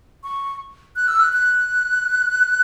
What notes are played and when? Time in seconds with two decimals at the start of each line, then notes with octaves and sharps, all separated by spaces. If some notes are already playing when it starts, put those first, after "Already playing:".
0.23 C#6
0.96 F#6
1.08 E6
1.20 F#6
1.33 F#6